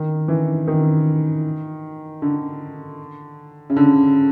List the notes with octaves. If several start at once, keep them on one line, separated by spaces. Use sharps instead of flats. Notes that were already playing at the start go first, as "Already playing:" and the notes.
Already playing: D#3
E3
D#3
D3
C#3
D3